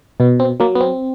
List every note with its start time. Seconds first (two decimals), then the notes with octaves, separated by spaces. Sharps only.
0.20 B2 B3
0.40 C4
0.60 F#3 A#3
0.75 B3
0.81 C4